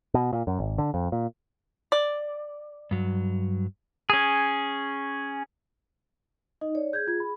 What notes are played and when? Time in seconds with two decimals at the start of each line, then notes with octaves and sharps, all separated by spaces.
0.14 B2
0.33 A#2
0.47 F#2
0.59 G#1
0.78 D3
0.94 F2
1.12 A#2
1.92 D5
2.91 G2 F#3
4.10 C#4 G#4
6.61 D#4 D#5
6.75 C#5 D5
6.93 G#4 G6 G#6
7.07 F4 G#6
7.20 B5